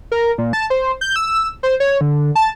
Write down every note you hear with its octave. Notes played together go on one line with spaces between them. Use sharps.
A#4
A#2
A5
C5
G6
E6
C5
C#5
D3
A5